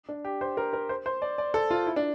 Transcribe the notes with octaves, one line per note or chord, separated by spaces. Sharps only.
D4
G4
C5
A#4
A#4
C5
C5
D5
D5
A4
F4
E4
D4